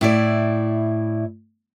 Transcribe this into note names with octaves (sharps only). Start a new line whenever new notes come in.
A2 E4 D5